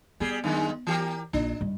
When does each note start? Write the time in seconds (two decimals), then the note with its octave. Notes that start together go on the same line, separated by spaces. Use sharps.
0.20 G3 B3 G#4
0.44 F#2 D#3 G#3
0.87 E3 G4 A#4
1.33 A#1 D4
1.61 G2